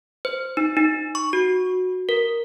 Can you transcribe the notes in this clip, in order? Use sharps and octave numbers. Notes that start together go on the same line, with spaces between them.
C5
D#4
D#4
C#6
F#4
A#4